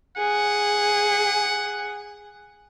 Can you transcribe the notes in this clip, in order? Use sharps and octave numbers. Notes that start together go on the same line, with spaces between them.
G#4 F#5